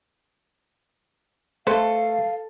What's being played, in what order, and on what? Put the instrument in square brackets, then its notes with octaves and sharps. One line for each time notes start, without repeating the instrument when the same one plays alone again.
[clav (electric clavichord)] A3 [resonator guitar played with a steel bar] A4 [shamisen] B4 C5 [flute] F5